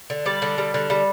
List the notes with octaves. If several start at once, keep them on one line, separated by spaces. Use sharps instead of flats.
D3
G3 D5
D3
G3
D3
G3